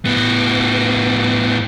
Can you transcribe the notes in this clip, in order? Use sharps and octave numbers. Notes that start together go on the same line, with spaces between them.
A2 B3